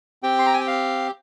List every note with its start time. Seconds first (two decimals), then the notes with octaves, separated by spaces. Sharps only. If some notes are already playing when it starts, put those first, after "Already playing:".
0.23 C4 G4 G5
0.39 C6
0.46 A#5
0.53 G#5
0.60 G5
0.67 F5